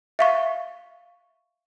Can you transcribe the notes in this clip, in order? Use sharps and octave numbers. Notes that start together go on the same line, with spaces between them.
E5 F5 C#6